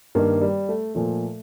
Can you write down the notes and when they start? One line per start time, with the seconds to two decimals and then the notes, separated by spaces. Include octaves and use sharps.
0.15 G2 D#3 A#3
0.41 G3
0.69 A3
0.95 A#2 F3 A3